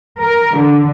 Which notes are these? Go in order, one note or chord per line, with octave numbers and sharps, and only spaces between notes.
A#4
D3